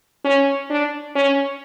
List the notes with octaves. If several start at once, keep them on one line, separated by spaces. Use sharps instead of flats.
C#4
D4
C#4